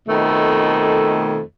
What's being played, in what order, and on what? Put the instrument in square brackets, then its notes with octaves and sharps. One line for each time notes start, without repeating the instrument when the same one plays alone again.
[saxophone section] F2 B2 D#3 A3